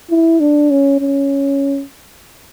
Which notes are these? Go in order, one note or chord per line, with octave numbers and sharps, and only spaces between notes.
E4
D4
C#4
C#4